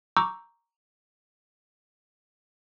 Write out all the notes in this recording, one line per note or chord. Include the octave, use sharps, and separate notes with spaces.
A#5 C#6 D6 E6 G6